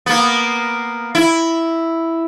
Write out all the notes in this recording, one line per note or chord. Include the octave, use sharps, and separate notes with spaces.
A#3 B3
E4